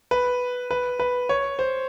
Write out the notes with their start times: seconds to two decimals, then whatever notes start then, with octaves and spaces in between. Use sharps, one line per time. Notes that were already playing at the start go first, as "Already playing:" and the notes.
0.11 B4
0.71 B4
1.00 B4
1.29 C#5
1.59 C5